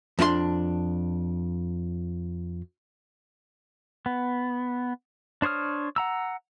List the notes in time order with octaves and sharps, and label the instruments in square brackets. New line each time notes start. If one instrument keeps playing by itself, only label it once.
[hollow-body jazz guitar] F2 D4 E4 C6
[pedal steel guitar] B3
D4 C5 C#5 D#6 F6
F#5 A#5 E6